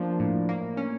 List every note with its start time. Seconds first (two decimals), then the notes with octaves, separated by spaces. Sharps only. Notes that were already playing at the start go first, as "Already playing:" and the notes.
Already playing: F3 A#3 D4
0.20 A2
0.49 A#3
0.77 C#4